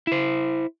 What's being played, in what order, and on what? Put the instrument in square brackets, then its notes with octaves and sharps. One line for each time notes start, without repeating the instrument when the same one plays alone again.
[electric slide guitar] E4 C5